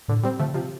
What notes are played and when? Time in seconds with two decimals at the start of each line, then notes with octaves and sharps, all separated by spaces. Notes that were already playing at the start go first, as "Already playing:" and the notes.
0.08 A2 D3
0.23 G3 C4
0.39 D3 F3 A3
0.54 C3 F3